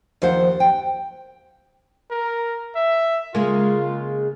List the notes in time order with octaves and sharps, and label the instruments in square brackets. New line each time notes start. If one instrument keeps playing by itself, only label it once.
[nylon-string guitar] D#2 F3 C5 F#5
G5
[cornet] A#4
E5
[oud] C#3 G#3 A#3 [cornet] F4